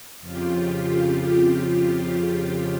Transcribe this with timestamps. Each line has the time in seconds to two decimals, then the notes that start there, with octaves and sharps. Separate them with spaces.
0.20 F2 C#3 F4 G4